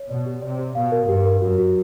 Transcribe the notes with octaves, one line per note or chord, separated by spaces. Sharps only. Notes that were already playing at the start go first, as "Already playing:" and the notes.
Already playing: C#5
B2 D5
G4
C3 D5
G4
B2 F5
A#4
G2 G4
A#4
F#2 F#4
F#4